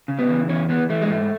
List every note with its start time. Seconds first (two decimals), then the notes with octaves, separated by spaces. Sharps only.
0.08 C#3
0.19 B3
0.29 E3
0.49 E2 C#4
0.69 E3 B3
0.90 E3 A3
1.02 G#3
1.10 G#2 A3